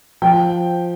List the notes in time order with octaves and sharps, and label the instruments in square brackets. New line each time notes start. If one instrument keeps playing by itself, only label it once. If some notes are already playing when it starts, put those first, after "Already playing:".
[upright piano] F3 G5